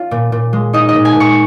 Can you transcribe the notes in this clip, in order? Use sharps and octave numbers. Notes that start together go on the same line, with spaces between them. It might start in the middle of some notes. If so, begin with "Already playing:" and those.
Already playing: C#4 F4
A#2
A#2
G#3
D#4 D#5
D#5
A#2
G#5
A#2
C#6